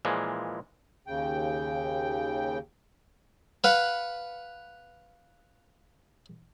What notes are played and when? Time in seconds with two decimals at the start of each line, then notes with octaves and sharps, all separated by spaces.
0.05 A#2 E3 F3 G#3
1.07 D#2 C#3 G5
3.64 B4 F5 F#5